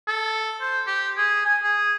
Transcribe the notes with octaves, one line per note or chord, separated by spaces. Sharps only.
A4
C5
G4
G#4
G#5
G#4